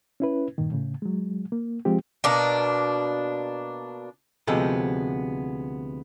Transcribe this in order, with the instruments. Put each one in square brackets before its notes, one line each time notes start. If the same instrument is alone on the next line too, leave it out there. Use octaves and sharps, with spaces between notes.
[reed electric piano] C#4 E4 B4
G2 A#2 D#3
A2 C#3
F#3 G#3
A#3
F3 G#3 C4 F4 G4
[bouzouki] B2 A#3 D4
[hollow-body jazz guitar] D2 C3 F3 G#3 B3 A4